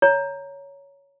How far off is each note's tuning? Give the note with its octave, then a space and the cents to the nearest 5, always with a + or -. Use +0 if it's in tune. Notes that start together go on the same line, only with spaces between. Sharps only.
C#5 +10 A#5 +0